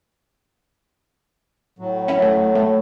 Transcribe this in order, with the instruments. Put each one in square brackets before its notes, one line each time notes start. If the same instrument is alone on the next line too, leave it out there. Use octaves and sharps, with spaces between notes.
[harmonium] A2 F#3
[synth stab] C#4 E4
A3
A3